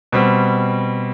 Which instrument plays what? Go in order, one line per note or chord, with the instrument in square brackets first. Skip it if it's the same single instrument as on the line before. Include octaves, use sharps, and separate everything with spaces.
[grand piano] B2 G3 C4